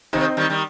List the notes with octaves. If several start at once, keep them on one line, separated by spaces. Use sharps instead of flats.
C3 D#3 C4 D#4
D#3 G3
D#3 G3